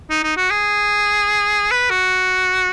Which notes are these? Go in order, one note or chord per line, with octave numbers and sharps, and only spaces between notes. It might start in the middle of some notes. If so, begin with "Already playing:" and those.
D#4
D#4
F#4
G#4
B4
F#4